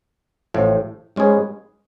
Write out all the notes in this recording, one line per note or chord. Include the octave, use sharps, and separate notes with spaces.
A1 A2 F3
G#2 G#3 C#4 G#4 B4